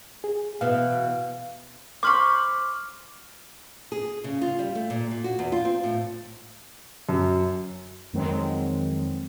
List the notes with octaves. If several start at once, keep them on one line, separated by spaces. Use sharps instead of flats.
G#4
B2 E3 B3 F5
C5 B5 C#6 D6 F6
G#4
C#3
F4
G3
A3
A#2
A#2
F#4
E2
F4
C4
A2
F#2
F2 D#3 F#3 G#3 C4